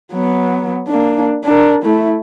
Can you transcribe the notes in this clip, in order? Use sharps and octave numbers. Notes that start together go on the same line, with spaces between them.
F#3 B3
A#3 D4
D4 A#4
A3 E4